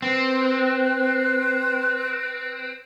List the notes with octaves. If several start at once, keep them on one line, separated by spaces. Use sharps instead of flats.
C4 B4